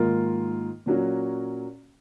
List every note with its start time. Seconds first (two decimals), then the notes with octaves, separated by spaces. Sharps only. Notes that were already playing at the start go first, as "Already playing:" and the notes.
Already playing: G#2 D#3 A#3 F4 A#4
0.86 A#2 F#3 A#3 C#4 F#4